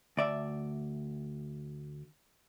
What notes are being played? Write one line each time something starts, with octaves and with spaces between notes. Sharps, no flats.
D2 D5 E5